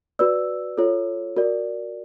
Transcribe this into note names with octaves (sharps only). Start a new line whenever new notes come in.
F#4 B4 D5 E6
F4 A4 C#5
F#4 A#4 D5